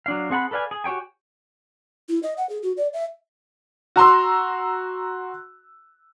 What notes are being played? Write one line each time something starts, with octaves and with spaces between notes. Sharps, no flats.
F#3 D4 F5
C4 G#4 F#5 A5 B5
A4 B4 D5 F5 G#5
G#4
F#4 G4 C#5 G5 G#5
E4
D#5
F#5
G#4
F#4
D5
E5
F#4 A#5 C6 E6